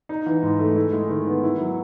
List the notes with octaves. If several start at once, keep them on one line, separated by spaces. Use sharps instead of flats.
D#4
E3
G#2
A3
E4
G#3
D#3
B3
E4
F#3